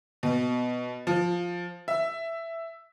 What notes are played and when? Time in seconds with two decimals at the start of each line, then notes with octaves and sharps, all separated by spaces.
0.23 B2
1.07 F3
1.88 E5